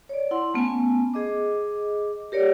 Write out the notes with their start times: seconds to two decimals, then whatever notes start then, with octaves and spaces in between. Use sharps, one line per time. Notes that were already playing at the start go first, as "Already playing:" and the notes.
0.09 C#5 D5
0.31 E4 F#5 C6
0.54 A3 B3 C#4 G#5
1.14 G#4 D#5 D6
2.32 G4 A#4 C#5 D5